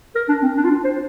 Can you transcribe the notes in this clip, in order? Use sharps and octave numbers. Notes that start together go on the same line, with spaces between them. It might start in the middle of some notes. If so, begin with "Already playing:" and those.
A#4
D4
C4
D4
F4
D4
C5